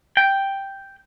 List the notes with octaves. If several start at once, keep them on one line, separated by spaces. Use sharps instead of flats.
G5